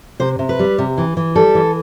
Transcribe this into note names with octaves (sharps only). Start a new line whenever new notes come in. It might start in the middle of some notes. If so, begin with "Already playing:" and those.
C3 C5
C3
B4
G3
C3
E3
E3
G3 A4
E3